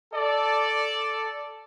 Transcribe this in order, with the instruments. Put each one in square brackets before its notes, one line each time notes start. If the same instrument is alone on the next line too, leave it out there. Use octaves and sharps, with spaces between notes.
[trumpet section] A4 D5